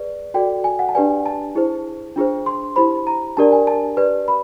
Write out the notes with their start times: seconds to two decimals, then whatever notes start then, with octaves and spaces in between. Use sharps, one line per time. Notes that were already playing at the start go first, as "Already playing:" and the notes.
Already playing: G#4 B4 D5
0.34 F#4 A4 D5 G5
0.64 G#5
0.79 F#5
0.89 A5
0.95 D4 G4 B4 D5 G#5
1.26 A5
1.55 E4 G#4 C5
2.16 D4 F4 G#4 C5
2.46 C6
2.76 E4 G4 C5 B5
3.07 A#5
3.37 D4 G4 A#4 D5 A5
3.52 G#5
3.67 A5
3.97 G4 B4 D5
4.28 B5